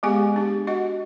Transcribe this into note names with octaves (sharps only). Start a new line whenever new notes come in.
G#3 B3 G4 G#4 G#5
D4 G4
F#4 D#5 F#5